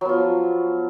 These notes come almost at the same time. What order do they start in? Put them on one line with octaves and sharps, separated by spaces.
F#3 B3 F4 F3